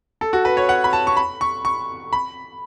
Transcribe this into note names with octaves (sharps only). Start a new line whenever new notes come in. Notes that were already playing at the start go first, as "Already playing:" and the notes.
A4
F#4
B4
C#5
F#5
B5
A5
C#6
B5
C#6
C#6
B5